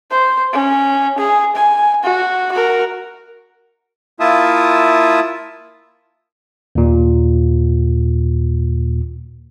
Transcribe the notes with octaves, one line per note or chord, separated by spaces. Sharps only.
C5
C#4
G#4
G#5
F#4
F#4 A#4
A#3 E4 F4 E5 A5 D#6
D#2 A#2